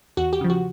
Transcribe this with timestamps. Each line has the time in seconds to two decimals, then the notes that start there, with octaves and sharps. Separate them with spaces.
0.17 E2 F#4
0.33 G4
0.41 C#3 F3
0.50 F#4